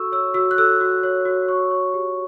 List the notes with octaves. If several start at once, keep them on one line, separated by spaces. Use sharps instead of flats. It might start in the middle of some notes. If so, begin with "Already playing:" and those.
Already playing: F#4 A4 C#6 E6
C#5 E6
F#4 E6
F#6
A4 E6
F#4
C#5
F#4
C#5 C#6
C#5
G4